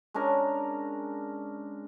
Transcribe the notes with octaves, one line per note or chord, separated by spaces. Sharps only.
G#3 C#4 D4 A#4